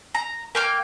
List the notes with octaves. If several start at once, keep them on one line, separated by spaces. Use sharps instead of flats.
A#5
A#3 G5 F6